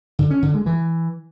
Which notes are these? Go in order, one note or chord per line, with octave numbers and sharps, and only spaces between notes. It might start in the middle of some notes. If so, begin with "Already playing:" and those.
D3
C#4
D3
G#3
E3